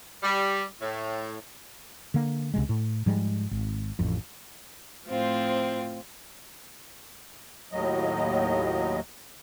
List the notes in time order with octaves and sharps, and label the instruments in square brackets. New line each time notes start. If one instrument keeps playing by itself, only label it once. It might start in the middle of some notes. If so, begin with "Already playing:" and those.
[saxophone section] G3
A2
[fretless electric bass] D3 A#3
C#2 C3 G#3
A2
G#2 F3 G3 G#3
G#1
A1 F2
[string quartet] A2 F3 C4 F4
[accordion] D#2 A2 F#3 D#5